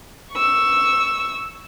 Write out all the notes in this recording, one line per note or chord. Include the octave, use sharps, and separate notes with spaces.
C#6 E6